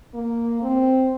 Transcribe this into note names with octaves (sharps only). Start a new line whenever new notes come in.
A#3
C4